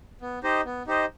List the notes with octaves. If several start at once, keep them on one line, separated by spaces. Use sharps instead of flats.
B3
D#4 G4 C5 D#5
B3
D#4 G4 C5 D#5